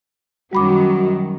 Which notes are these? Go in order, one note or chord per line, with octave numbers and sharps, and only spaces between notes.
F#2 D#3 F#3 G3 F#4 B5 D6